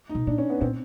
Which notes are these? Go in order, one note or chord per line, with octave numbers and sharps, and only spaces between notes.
D#4
B2
A#2 D4
C#4
B3
A#2 C4